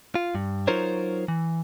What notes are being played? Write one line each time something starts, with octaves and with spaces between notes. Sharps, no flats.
F4
G2
F#3 D#4 F4 A#4 C5 C#5
E3